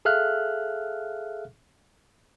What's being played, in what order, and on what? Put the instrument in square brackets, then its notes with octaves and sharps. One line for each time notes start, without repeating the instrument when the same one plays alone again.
[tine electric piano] G#4 A4 E5 F5 F6 F#6